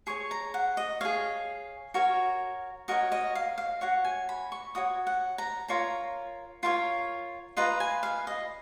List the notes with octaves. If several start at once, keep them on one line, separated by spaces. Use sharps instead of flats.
G#4 C#5 C#6
A#5
F#5
D#5
G#4 C#5 F5
F#4 A#4 C#5
F#4 A#4 C#5 D#5
D#5
F5
F5
F#4 C#5 F#5
G#5
B5
C#6
F#4 C#5 D#6
F#5
A#5
F4 A#4 C#5 A#5
F4 A#4 C#5
F4 B4 D#5 A#5
G#5
F5
D#5